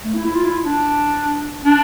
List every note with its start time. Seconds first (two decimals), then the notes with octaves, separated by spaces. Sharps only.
0.05 A3
0.15 E4
0.25 E4
0.35 F4
0.45 E4
0.65 D4
1.65 D4